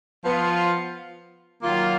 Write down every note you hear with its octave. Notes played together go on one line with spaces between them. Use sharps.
F3 B3 F4
D#3 F#3 A#3 F4